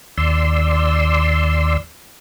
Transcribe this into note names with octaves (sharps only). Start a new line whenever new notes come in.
D#2 D5 C6 E6